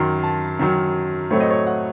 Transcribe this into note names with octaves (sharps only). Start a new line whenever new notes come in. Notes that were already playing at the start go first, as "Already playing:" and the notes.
Already playing: F#2 D#3 F#3 C6
A5
F#2 D#3 F#3
A2 F#3 A3 C4 C#5
D#5
C#5
F#5